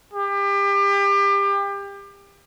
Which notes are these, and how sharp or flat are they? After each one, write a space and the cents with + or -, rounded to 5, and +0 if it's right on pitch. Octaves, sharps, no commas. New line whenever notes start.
G4 +30